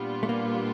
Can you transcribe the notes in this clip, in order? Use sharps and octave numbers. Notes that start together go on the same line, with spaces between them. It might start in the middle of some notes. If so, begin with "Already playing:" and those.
Already playing: A#2 G3 B3 D4 F4
A3
A#3